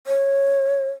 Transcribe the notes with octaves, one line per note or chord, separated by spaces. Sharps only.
C#5